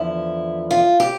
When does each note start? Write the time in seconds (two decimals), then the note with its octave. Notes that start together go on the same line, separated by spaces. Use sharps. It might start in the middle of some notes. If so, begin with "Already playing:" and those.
Already playing: E2 D3 F3 E4
0.71 F4
1.00 G4